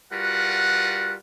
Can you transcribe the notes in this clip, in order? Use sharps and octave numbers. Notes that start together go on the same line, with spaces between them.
G3 F4 F#4 A#4 B4 F#5